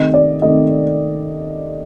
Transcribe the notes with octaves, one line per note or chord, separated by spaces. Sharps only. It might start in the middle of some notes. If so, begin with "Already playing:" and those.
Already playing: C3 D#3 A3 D#5
D5
C3 D#3 A3 D#5